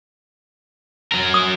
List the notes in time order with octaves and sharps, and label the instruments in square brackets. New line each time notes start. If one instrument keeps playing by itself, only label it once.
[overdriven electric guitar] F#3 A#4
[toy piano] D#6